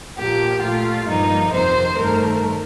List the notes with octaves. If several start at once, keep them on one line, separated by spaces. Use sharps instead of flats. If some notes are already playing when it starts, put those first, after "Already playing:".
A#2 F3 A#3 G4
A#2 A3 F4
G2 F3 A#3 D#4
F2 C3 D#3 C5
G2 D#3 A3 A#4